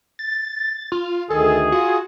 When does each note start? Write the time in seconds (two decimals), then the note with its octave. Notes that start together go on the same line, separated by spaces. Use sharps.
0.19 A6
0.92 F4
1.30 D2 D#3 G#4 A4
1.72 F4 F#4